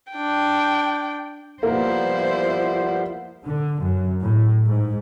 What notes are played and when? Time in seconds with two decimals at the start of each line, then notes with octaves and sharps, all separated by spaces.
0.13 D4 G5
1.63 F3 G3 A#3 B3 E4 A#4 C5
3.45 D3
3.82 F#2
4.23 A2
4.65 G#2